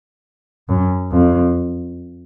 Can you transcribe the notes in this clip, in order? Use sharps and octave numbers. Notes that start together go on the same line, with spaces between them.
F#2
F2